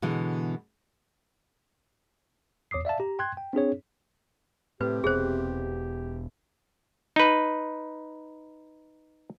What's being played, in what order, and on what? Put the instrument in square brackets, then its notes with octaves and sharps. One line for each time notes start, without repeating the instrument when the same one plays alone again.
[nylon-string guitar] B2 D3 E3 G#3
[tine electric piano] E2 C#5 D6 D#6 C7
D5 E5 F5 A5
G4 A#5
G5 C6 F#6 G#6
G5
C4 D4 G#4 C#5
[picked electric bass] A2 [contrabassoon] C3 [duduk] G4 [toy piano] B4
[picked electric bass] E1 B2 [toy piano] G#4 C5
[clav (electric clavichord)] D#4 B4